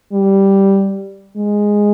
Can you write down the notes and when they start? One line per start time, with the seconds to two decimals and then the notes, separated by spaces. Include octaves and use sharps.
0.13 G3
1.36 G#3